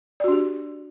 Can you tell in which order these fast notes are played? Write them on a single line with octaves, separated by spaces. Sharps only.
D5 F#4 D4 G4